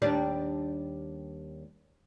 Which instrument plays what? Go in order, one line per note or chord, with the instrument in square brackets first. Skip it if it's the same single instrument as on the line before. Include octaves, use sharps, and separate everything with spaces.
[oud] D#2 G3 D4